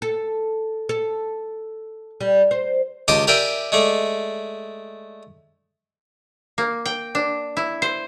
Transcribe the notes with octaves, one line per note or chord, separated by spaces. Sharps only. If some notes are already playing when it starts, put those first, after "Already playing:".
A4
A4
G3
C5
C#2 G4 D#5 A5 C6 D6
G4 A#4 D5 E5 G5 G#5
G#3 A3 D5
A#3
G5
D4
E4
C5